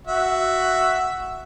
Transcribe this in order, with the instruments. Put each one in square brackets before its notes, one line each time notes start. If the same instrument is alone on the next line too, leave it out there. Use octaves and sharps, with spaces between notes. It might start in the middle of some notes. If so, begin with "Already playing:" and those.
[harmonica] F#4 E5